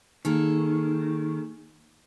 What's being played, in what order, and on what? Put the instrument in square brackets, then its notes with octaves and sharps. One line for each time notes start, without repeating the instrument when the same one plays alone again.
[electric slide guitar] D#3 [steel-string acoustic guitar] A#3 G#4 A4